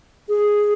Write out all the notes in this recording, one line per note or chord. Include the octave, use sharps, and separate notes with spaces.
G#4